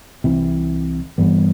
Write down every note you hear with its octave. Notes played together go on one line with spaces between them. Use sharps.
C2 C3 E3
G2 E3 G3 B3